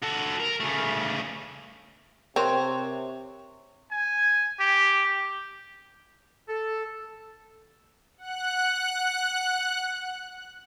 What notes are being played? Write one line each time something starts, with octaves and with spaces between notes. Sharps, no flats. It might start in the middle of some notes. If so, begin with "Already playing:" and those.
F#4 A4
A#4
C#3 A3
C3 C4 A#4 C5 C#5 C6
G#5
G4
A4
F#5 F#6